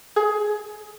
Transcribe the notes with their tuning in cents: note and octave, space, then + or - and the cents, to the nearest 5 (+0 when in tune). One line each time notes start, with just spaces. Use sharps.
G#4 +20